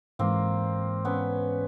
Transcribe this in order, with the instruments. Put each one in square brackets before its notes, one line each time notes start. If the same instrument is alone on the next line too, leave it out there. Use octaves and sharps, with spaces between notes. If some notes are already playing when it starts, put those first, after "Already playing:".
[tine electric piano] G#2 E3 G#3 [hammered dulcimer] A#3 C4
[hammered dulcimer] B3 C#4